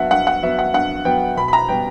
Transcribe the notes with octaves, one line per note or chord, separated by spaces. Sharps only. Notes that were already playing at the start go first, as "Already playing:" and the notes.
Already playing: G2 F#3 B3 E5 F#5
G2 F#5
F#5
F#3 B3 E5
F#5
G2 F#5
F#3 B3 G5
B2 B5
B5
A#5
G3 B3 G5